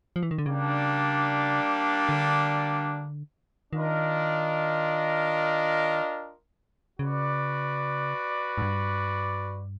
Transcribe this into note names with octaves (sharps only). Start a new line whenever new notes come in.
F3
E3
D#3
D3
C#3 G3 A#3 D4
D3
D#3 D4 F4 A#4 D#5
C#3 F#4 B4 D5
G#2
G2